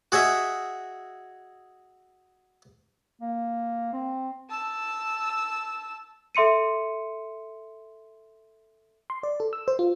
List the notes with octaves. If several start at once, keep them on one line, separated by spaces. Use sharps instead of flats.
F#4 G#4 D#5 E5
A#3
C4
A5 E6
A4 E5 C6 C#7 D#7
C6
D5
A4
E6
C5
F4